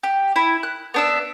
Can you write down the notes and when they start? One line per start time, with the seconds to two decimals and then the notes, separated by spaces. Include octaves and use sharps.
0.03 G4
0.36 E4
0.63 F#6
0.94 B3 D4 E5